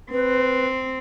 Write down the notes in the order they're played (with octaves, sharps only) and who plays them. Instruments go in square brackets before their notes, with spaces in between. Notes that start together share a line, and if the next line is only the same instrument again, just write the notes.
[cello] C4 [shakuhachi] B4